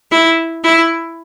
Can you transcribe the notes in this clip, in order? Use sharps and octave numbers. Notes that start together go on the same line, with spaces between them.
E4
E4